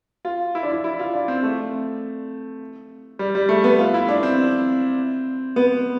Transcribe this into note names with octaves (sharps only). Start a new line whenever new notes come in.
F4
E4
D4
E4
E4
F4
D4
C4
A3
G3
G3
A3
B3
F4
E4
D4
C4
B3